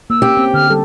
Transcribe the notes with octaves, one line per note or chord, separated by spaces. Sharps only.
A#3 E6
C#4 G4
C4
D3 F6
G3 G4 A4